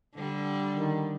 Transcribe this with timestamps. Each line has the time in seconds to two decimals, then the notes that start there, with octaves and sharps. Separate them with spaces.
0.15 D3 G3
0.75 D#3